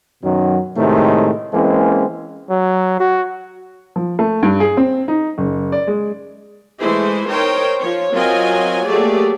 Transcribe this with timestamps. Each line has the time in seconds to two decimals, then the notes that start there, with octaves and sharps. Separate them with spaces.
0.23 F#2 B2 D#3 F#3
0.77 A2 C3 D#3 G#3 A3
1.54 E3 G#3 A#3 C4 C#4
2.50 F#3
3.00 F#4
3.96 F3
4.19 A3
4.43 G2
4.60 G#4
4.77 C4
5.08 D#4
5.38 F#1
5.72 D5
5.87 G#3
6.80 E3 G#3 A3 E4 G#4 C5
7.28 D#4 A#4 C5 C#5 G5
7.79 F3 C#5
8.12 F#3 C4 F4 A#4 D#5 G#5
8.88 F#3 A3 A#3 G4 G#4 D5